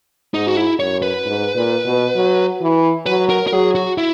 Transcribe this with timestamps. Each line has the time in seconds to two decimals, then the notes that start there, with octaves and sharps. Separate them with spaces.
0.34 G#2 D#4
0.47 F#4
0.57 E4
0.80 F#2 C#5
1.02 B4
1.25 G#2
1.55 A#2
1.85 B2
2.16 F#3
2.61 E3
3.06 F#3 B4
3.30 A#4
3.47 A#4
3.53 F#3 G#4
3.75 F#4
3.98 E4